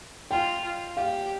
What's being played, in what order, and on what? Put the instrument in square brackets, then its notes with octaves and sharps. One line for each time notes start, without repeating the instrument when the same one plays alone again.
[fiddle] F4 [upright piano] G5
[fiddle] F4
[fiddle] G4 [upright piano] F5